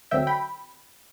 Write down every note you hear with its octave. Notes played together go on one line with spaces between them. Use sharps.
D2 D3 F#3 C4 E5 G5
G5 B5